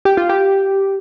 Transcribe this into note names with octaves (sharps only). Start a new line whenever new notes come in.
G4
F4
G4